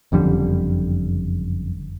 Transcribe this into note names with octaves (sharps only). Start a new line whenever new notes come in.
F#1 F2 D3 G3